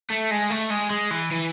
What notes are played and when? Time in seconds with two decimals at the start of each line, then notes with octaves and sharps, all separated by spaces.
0.10 A3
0.31 G#3
0.50 A3
0.71 G#3
0.90 G#3
1.11 E3
1.31 E3